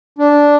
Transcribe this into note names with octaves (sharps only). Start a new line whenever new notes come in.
D4